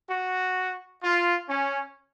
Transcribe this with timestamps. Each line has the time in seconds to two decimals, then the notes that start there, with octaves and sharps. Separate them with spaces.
0.10 F#4
1.03 F4
1.49 C#4